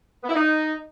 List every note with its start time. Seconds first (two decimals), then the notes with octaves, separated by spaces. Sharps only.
0.23 B3
0.29 E4
0.35 D#4